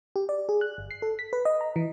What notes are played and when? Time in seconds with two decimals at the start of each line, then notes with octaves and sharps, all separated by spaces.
0.16 G4
0.29 D5
0.49 G#4
0.61 F#6
0.78 G1
0.91 C7
1.02 A4
1.19 B6
1.33 B4
1.45 D#5
1.61 A#5
1.76 E3